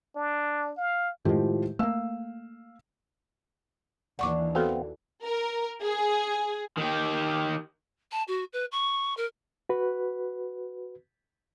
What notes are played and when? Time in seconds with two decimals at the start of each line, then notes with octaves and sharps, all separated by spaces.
0.16 D4
0.77 F5
1.25 A2 D#3 F3 G#3 G4
1.79 A3 A#3 F5 E6
4.19 D#2 E3 D4 F#5 C#6 D6
4.55 B3 C4 F#4 A4 F5
5.25 A#4
5.82 G#4
6.78 D#3 G4
8.12 A5
8.28 F#4
8.53 B4
8.71 C#6
9.17 A#4
9.69 F#4 B4